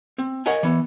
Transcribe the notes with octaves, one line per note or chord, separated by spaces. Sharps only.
C4
A#4 C#5 D#5 F#5 G#5
E3 B3